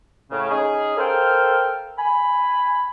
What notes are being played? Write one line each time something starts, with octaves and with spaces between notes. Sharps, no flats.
A2 C#3
C#4 D#4 G#4
A4 A#4 C5 F5 G5
G#5 B5